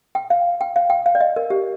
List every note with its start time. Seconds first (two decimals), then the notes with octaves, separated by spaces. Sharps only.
0.15 G5
0.30 F5
0.61 G5
0.76 F5
0.90 G5
1.06 F5
1.15 D5
1.20 D#5
1.36 A#4
1.50 G4